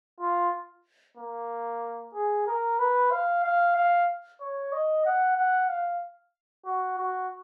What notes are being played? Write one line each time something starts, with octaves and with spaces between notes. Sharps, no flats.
F4
A#3
G#4
A#4
B4
F5
F5
F5
C#5
D#5
F#5
F#5
F5
F#4
F#4